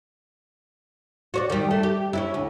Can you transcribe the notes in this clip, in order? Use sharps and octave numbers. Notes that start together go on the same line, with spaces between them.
F#4 C#5 D5
D#3 G3
A3
G4
C#4 D4 E4
D2